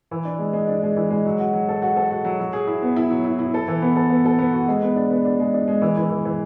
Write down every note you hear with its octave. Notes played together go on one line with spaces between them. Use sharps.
E3
D4
G#3
G#3
D4
G#3
E3
G#3
F#3
F#4
F#3
A4
F#4
A4
F#4
F#3
F#3
G#4
E4
B3
E4
F#3
E4
E4
A4
E3
B3
A4
B3
A4
B3
F#4
G#3
B3
D4
B3
D4
G#3
D4
G#3
E3
E3
E3
E3